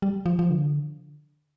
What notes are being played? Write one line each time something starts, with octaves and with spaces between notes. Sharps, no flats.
G3
F3
F3
D3